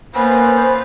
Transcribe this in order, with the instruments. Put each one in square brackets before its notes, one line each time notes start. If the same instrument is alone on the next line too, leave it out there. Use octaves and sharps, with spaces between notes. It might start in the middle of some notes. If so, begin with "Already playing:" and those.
[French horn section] A#3 [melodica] B3 C#4 [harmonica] F4 B4 [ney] C5